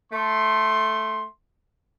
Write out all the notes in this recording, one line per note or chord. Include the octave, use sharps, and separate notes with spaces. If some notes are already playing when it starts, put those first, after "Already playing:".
A3 C6